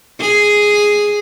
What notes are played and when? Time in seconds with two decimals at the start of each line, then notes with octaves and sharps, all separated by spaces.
0.21 G#4